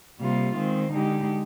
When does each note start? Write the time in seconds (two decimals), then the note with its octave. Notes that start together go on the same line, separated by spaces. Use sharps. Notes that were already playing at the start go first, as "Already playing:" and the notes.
0.20 C3 G3 A#3 F4
0.56 D#3 G#3 C4
0.92 D3 G#3 D#4 G4